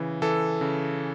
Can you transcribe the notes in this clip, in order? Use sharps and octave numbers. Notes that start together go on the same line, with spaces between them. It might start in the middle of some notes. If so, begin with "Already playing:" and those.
Already playing: C#3 E3
E3 A4
C#3